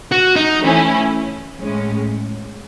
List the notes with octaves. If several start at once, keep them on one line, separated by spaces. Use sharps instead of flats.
F#4
D#4
E3 A3 C#4 E4
A2 G#3 C#4